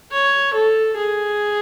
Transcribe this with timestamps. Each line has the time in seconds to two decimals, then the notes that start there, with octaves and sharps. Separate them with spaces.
0.12 C#5
0.55 A4
0.98 G#4